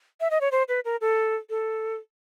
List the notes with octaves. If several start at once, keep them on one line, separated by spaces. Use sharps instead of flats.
E5
D#5
C#5
C5
B4
A#4
A4
A4